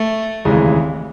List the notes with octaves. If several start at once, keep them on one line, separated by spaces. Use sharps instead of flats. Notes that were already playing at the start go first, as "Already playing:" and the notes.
Already playing: A3
F1 D#2 C#3 E3 G#3